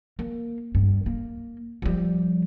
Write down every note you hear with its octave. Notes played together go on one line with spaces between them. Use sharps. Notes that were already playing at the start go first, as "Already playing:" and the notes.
A#3
G2
A#3
F3 G3